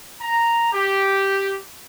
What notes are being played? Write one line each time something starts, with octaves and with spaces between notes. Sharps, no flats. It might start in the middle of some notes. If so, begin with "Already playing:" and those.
A#5
G4